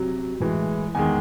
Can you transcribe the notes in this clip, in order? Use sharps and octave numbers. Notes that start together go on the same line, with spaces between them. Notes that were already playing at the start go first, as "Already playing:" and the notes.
Already playing: C3 F#3
A2 E3 G#3
E2 D#3 G#3 G#5